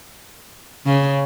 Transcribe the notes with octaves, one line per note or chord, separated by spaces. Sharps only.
C#3